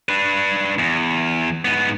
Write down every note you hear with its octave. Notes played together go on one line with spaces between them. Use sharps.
D4 B4
E2
G#2 B3